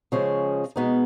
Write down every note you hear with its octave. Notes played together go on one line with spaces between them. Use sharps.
C#3 F3 G#3 C#4
B2 G#3 B3 D#4